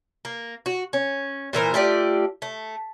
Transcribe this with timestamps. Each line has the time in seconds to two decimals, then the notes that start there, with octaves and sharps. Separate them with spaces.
0.25 A#3
0.66 F#4
0.93 C#4
1.53 A#2 E3 A#4 C5
1.74 A3 F4 G4 D5
2.42 A3